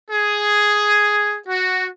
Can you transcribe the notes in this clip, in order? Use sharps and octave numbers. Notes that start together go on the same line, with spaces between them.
G#4
F#4